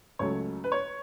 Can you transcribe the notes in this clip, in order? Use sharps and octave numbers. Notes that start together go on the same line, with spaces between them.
C#2 C#3 F#3 A3 C#5
B4
C#5